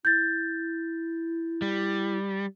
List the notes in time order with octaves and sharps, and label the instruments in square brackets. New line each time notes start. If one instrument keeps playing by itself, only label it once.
[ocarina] E4 [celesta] G6 A6
[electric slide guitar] G3